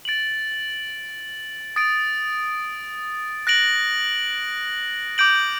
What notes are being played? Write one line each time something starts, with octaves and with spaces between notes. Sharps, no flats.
A6 D7 F#7
D#6 A6 D7
F#6 A#6 D7 F#7
D6 G6 D7 F#7